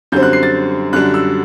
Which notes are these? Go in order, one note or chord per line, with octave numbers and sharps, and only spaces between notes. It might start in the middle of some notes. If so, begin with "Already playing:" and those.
F#2 D3 G3 C4 G6
F#6
C7
A6
F#2 D3 G3 D4 F#6
E6